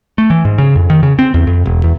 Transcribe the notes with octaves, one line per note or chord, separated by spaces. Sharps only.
A3
E3
G#2
C#3
F2
D#3
C#3
C4
E2
F2
E1
E2